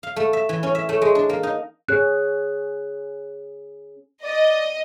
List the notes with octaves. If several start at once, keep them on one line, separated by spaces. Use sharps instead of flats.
F5
A3
E5
E3
C#4
E5
A3
G#3
D4
A#3
D#4
C#4 G#4 C#5 F#6
D5 D#5